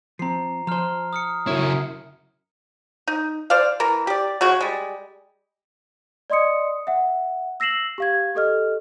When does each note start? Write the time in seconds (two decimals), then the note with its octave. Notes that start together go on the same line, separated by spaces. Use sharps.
0.19 F3 C4 A#5 C7
0.67 F3 C5 A#5 F6
1.13 D#6 F6 C#7
1.47 F#2 C#3 E4 C#5
3.08 D#4
3.50 C5 D5 F5
3.80 E3 A#4
4.07 G4 D5
4.41 C#3 G#3 F#4
4.61 G3 G#3
6.30 D5 D#5 C6 D#6 C#7
6.87 E5 F#5
7.60 E6 A#6 C7 E7 F#7
7.98 G4 F5 G#6
8.35 G4 A4 D#5 F6